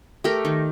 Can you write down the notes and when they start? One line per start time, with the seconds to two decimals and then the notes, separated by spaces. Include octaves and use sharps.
0.24 A3 G4 A#4
0.45 D#3